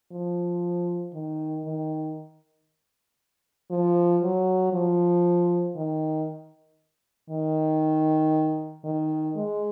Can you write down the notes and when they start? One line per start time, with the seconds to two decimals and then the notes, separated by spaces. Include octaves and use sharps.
0.12 F3
1.14 D#3
1.65 D#3
3.71 F3
4.23 F#3
4.73 F3
5.76 D#3
7.30 D#3
8.84 D#3
9.36 G#3